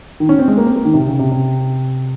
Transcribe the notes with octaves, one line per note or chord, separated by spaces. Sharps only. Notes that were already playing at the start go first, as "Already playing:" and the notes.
D#3
C#4
C4
G#3
A#3
C4
A#3
D#3
C3
C#3
C3
C3